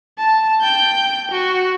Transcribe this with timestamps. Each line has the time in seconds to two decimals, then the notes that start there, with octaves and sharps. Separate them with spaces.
0.18 A5
0.61 G5 G6
1.31 F#4